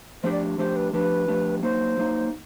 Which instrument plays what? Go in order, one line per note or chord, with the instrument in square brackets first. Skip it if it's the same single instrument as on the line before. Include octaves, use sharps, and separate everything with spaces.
[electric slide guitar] F3 A3 D4 G4 [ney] C5
[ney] D5
[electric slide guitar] F3 A3 D4 G4 [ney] C5
[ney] B4
[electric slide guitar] F3 A3 D4 G4 [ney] B4
[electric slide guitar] F3 A3 D4 G4
[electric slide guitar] F#3 A#3 D#4 [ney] C5
[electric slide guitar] F#3 A#3 D#4